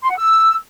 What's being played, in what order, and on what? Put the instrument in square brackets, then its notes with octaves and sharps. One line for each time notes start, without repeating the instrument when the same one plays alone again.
[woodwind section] C6
F#5
E6